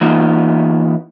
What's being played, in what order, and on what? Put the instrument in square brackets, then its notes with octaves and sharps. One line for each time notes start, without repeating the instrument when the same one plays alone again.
[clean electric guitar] E3 A#3 B3 D#4 F4